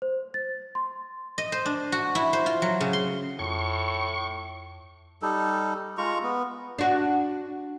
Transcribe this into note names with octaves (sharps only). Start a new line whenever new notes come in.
C5
A6
C6
D#5
C5
D4
F#4
E4
C5
F4
F#3
C#3
C6
F2 A2 C#6
G3 D#4 A4
G#3 F4 A#5 C#6
B3
D4 F#4